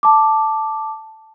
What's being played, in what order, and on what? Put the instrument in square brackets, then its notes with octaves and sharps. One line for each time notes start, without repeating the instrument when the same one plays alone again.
[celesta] A5 D6